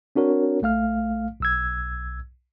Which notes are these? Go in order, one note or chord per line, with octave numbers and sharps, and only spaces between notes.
C4 D4 F#4 A#4 C#5
A#1 A3 F5 F6
B1 E6 G#6